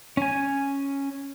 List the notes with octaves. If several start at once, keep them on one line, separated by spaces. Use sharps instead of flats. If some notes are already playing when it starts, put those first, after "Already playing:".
C#4 G#5